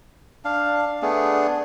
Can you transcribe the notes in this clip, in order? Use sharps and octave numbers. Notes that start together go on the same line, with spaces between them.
D4 F5
A3 B3 D4 G#4